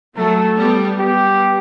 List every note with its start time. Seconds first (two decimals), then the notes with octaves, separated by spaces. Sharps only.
0.16 F#3 A3 A4
0.57 G3 B3
0.98 G3 B3 G4